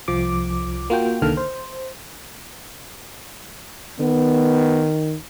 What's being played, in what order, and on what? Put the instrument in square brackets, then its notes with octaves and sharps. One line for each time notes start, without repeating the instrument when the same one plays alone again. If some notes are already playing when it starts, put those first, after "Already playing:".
[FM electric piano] C2 F3 D6
A#3 F4 F#4 G5
C2 D3 D#3 A#3 A4 F6
C5
[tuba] D#3 [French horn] B3